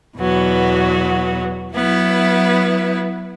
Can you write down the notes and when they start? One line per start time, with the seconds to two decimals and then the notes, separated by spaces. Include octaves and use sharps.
0.17 E2 B2 F#3 B3 F#4
1.72 F#3 B3 E4 B4